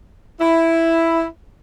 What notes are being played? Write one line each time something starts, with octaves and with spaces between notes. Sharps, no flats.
E4